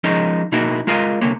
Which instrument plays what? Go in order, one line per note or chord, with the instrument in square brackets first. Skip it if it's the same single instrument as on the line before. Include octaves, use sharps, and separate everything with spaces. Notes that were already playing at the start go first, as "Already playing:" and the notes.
[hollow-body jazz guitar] F3 G#3 C#4 D#4 A#4 D#5
B2 A#3 D#4 E4 F#4 A#4
G#3 F4 A#4 D#5 F5
C2 D3 A#3 C#5